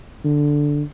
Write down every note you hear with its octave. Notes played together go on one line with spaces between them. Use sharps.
D3